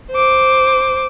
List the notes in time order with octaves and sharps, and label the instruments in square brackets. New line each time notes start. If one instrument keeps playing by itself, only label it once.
[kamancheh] C5 D6